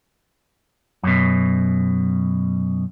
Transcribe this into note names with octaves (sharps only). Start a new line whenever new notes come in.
F#2 B2